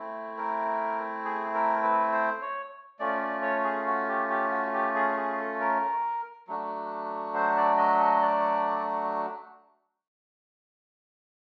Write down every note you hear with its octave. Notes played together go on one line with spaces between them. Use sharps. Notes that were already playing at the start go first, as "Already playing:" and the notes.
Already playing: A3 C4 E4
A#4
G#4
A#4
B4
C5
C#5
A3 C#4 F4 D5
D5
C#5
G#4
F#4
G4
G4
F#4
G4
G#4
G#4
A4
A#4
F#3 A3 D4 F#4
C5
D5
D#5
D#5
D5